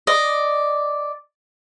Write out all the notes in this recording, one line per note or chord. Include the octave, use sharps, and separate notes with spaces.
D5 D#5